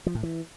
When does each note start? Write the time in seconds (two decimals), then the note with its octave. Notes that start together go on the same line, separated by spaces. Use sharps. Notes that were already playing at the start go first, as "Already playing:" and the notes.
0.06 F3
0.15 A2
0.23 E3